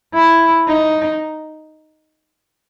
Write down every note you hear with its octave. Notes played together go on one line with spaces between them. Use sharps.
E4
D#4